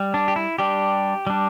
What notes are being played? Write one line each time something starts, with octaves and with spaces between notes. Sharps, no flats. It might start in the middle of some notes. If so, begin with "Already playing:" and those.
Already playing: G3
D4
G4
E4
G3 D4 G4
G3 D4